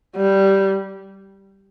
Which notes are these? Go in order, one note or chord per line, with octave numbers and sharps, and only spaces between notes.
G3